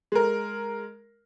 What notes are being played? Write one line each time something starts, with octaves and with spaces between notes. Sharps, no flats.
G#3 A#4